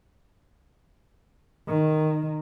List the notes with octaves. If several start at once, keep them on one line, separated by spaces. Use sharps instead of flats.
D#3